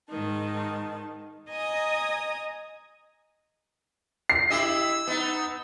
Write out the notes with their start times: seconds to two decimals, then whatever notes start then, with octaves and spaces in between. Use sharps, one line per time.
0.10 G#2 D#3 A5
1.49 D#5 G#5 A#5 D#6
4.30 C7
4.50 E4 G4 D#5 E6
5.07 B3 D#4